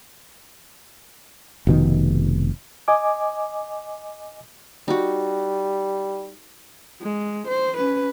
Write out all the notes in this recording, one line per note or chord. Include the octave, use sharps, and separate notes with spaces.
F1 B2 D#3
D#5 G#5 D6
G3 D#4 F#4
G#3
C5
C#4 B4